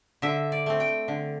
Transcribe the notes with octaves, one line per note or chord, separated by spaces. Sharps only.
D3 E5
D5
A3 C4
G5
D3